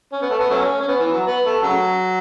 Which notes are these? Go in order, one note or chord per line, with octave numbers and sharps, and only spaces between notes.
C#4
B3
A3
B3
F#3 A3 C#4
C#4
B3
E3
F#3
B3
A3
C#3 F#3